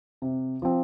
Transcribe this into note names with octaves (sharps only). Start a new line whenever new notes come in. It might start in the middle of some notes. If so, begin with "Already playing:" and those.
C3
F3 C4